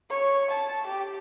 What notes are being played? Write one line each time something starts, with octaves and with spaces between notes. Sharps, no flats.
C#5
A5
G4